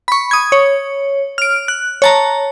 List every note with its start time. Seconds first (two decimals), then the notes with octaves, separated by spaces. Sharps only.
0.08 B5 C#6
0.31 D#6 G#6
0.52 C#5
1.38 F6 D7
1.68 F#6
2.02 C#5 A5 A#5